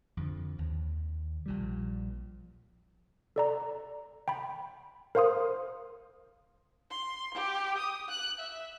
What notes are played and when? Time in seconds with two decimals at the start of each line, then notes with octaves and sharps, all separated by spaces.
0.17 F2 D3 F3
0.58 D#2
1.46 A#1 A#2 G3
3.36 A4 D5 A#5
4.28 G5 B5
5.15 A#4 C5 F5 C6 D#6
6.91 C6
7.34 G4
7.78 D#6
8.09 F#6
8.40 E5